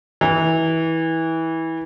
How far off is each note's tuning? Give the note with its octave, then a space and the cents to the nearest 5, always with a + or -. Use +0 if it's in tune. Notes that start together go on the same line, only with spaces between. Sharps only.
E3 -20